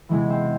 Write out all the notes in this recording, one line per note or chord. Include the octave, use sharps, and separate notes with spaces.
E2 C3 E3 G#3 E4
C4